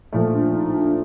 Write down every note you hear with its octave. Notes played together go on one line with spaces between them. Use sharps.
A#2 F3 A3
D4
D#4
D4